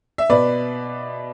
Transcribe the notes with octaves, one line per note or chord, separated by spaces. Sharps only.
E5
B2 B4 D5